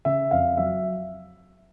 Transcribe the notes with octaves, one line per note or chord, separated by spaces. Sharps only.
C#3 E5
F2 F5
F#3 E5